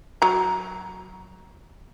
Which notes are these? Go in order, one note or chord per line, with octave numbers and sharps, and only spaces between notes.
F#3 A#5